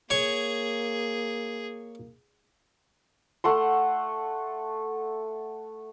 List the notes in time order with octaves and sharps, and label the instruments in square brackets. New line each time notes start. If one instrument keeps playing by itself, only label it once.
[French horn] A#3 [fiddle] G#4 [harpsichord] C#5 C#6
[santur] A3 F#5 C6